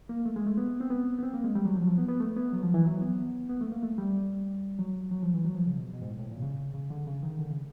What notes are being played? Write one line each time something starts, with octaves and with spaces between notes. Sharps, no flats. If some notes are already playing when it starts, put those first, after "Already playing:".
A#3
A3
G#3
A3
B3
C4
B3
B3
C4
A#3
G#3
G3
F#3
F3
F#3
F3
B3
B3
A3
B3
F#3
F3
E3
F#3
B3
B3
A3
A#3
A3
G3
F#3
F#3
F3
E3
F#3
F3
C#3
B2
B2
G#2
A2
A2
A#2
C3
C#3
C#3
D3
C#3
D#3
D3
C#3